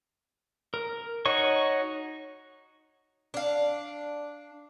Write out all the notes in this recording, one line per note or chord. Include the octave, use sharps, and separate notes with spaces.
A#4
D#4 F#4 C#5 C#6
D4 F5